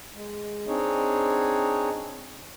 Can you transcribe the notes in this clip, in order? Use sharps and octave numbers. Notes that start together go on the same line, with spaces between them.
G#3
C4 D4 D#4 G#4 C#5